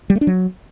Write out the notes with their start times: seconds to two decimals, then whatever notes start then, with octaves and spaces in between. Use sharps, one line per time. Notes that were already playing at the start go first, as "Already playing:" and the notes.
0.10 G3
0.15 A3
0.21 D4
0.27 F#3